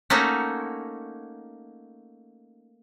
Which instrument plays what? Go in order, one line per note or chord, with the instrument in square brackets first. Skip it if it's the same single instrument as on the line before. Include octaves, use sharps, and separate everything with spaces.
[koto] A3 A#3 C#4 D#4 F#4